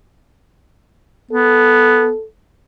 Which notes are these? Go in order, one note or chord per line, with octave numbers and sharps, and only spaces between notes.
B3 A4